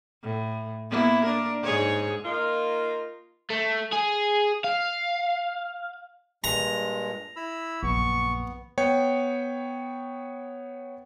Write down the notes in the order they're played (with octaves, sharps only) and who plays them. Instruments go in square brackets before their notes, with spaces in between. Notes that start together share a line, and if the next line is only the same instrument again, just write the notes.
[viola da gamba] A2
A#3 B3 E4
D4 A#4
G#2 G#4 C#5
[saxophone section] A#3 D#4 F4 A#4
[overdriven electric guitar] A3
G#4
F5
[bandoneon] G2 A#2 G#3 [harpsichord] A#5
[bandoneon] E4 B5 E6
[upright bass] A#1 F#2 [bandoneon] B3 [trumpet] C#6
[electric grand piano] B3 C#5 G5 C#7